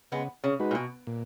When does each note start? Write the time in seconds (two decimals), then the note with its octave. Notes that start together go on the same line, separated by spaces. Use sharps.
0.12 C#3 G#3 B3
0.44 C#3
0.60 G#3 D#4 F#4 B4
0.71 A#2
0.75 B2
1.07 A#2